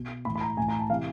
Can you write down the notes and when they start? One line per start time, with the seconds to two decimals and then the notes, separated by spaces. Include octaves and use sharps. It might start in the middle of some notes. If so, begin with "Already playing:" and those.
Already playing: B2
0.25 A2 E3 B5
0.36 B5
0.41 A#5
0.57 A2 E3 G#5
0.68 A#5
0.79 A5
0.90 C3 E3 F5